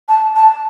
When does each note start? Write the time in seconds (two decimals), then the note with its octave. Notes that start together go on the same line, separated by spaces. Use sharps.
0.09 A5
0.35 A5